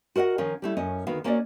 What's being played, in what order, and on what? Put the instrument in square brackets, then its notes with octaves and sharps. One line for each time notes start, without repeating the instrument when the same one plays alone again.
[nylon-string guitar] F#4 A#4 D#5 F5 F#5
D#3 F3 C#4 A#4 F5
G3 A3 E4
F#2 C#4 D#5
D2 D#3 B3 F#4 F5
A#3 C#4 F#4 A#4 D5 D#5